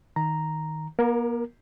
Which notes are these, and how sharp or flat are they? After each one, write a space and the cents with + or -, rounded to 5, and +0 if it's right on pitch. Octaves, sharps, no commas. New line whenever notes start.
D#3 +10 A#5 +0
A#3 +45 A#4 +0